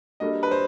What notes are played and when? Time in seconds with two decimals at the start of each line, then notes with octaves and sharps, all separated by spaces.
0.20 G3 A#3 D4 F#4 A4 D#5
0.43 B4
0.51 C5